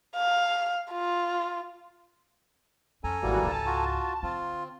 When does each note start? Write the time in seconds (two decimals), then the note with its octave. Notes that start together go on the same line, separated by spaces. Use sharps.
0.16 F5
0.92 F4
3.04 F2 C#4 A4 G#5 A#5
3.22 G#1 E3 G3 A#3 F#4
3.43 C#2 G#2 A5
3.66 F4 F#4
4.23 D3 C4 F4